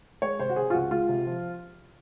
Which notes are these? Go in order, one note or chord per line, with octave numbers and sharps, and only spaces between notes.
G#3 C#5
C3 C5
F#4
C3 G#4
F4
C#2 F#4
G#3 F4
C3
F3